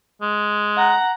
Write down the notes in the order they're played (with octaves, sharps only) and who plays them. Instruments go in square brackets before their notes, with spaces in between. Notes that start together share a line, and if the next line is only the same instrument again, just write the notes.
[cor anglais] G#3
[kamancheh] F#5 A#5